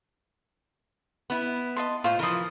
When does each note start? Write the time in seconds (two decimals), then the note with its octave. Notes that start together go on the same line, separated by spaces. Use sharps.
1.30 B3 E4
1.76 D#5 A5 C6
2.04 A2 F4 C5
2.19 E3 F3 A#4 D#6